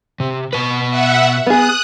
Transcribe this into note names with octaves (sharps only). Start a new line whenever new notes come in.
C3
B2 B4
E5 F#5
B3 G#4 D#6 F#6